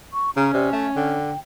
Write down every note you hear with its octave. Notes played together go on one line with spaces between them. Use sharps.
C#6
C#3 C#4 A#5
C3 D5
A3 E5
D3 G5